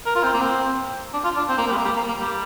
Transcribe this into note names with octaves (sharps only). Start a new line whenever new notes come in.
A#4
F4
C4
A#3
C4
D4
F4
D4
C4
A#3
C4
G3
A#3
G3
A#3
A#3
G3